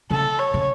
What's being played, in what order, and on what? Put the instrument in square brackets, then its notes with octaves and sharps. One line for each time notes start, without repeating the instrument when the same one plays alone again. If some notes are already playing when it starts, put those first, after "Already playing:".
[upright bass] C#3 [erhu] A4
[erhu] C#5
[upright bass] C#3